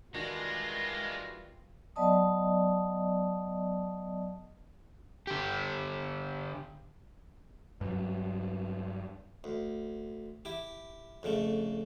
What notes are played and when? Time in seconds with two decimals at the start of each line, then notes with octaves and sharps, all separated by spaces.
0.14 D#3 E3 G3 G#3 D4 F4 F#4 A#6
1.96 F#3 B3 D5 D#5 A5 D#6
5.27 D3 G4
7.81 G2 F#3
9.44 D2
10.45 E4 G4
11.23 F2 C#3 A3